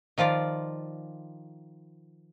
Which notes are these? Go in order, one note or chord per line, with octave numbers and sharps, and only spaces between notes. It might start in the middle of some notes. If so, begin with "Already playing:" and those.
D#3 F3 F4 D5